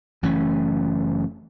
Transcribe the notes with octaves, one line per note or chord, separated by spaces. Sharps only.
F#1 E3 A3 C#4